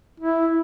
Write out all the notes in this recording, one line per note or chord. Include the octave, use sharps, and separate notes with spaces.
E4